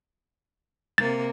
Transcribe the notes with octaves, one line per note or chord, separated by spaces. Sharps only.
C3 A#3 A6